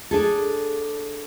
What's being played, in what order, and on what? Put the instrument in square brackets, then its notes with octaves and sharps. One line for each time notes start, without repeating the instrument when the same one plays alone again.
[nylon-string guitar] D4 G#4 A4